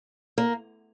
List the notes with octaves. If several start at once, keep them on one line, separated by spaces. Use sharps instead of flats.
A#3